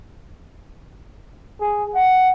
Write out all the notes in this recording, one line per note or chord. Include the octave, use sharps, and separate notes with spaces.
G#4
F#5